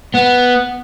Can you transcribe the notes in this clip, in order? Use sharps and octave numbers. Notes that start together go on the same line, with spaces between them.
B3